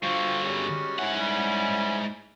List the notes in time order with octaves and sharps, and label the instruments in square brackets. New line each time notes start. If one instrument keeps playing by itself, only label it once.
[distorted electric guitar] G2 D3 [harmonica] F4 C5 [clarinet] F#4
[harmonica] G3 G#3 C#4
[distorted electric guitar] G#2 F#5 [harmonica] C#4 E4 G#5
[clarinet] G3